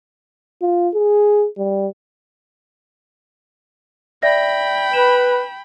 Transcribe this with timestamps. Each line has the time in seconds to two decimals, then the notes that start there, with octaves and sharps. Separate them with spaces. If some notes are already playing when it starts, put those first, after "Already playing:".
0.62 F4
0.94 G#4
1.58 G3
4.23 D5 E5 G5 B5 A#6
4.93 B4 E7